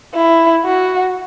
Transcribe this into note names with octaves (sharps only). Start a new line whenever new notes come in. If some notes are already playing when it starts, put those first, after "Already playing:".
E4
F#4